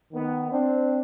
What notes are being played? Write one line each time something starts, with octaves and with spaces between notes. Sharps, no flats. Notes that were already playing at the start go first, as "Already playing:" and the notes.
D#3 B3
C4 D4